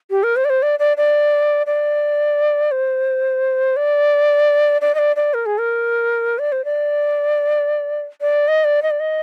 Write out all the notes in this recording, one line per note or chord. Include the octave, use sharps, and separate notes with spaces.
G4
A#4
C5
D5
C5
D5
D5
D5
D5
C5
D5
D5
D#5
D5
D5
A#4
G#4
A#4
D5
C5
D5
D5
D#5
D5
D#5
D5
D#5